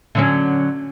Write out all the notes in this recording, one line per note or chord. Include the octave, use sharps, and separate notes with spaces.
D3 F#3 C#4